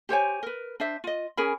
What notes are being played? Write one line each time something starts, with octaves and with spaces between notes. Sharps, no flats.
G4 C5 C#5 G#5
A#4 B4
D4 C5 E5
F4 D#5
C#4 G#4 A#4 B5